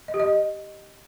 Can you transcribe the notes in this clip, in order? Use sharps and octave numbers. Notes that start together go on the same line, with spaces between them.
D#5
G4
D#5